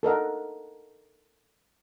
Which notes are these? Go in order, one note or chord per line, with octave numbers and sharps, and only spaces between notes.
A4 A#4 D#5 F#5